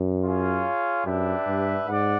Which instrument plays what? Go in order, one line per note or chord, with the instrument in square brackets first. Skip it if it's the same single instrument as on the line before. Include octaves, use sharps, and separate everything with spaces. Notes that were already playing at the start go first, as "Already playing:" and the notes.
Already playing: [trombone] F#2
[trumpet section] F4 G#4 C#5 F5
[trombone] F#2 [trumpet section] D4 G4 B4 E5
[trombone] G2
[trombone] G#2 [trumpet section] D5 F#5